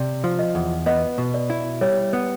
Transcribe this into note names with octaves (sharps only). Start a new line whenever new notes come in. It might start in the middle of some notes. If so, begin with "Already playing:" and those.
Already playing: C3 D5
F3
D#5
E2
B3 D#5
B2
D5
E4
G3 C#5
B3